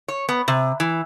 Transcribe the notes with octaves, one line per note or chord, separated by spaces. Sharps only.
C#5
B3
C3
E3